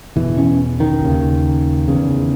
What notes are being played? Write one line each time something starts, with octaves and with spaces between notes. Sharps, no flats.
E2 B2 E3
C#4
D#3
D#2 C#3
E2 C#3